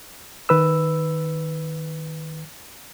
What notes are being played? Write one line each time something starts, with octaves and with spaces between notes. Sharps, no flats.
D#3 B4 E6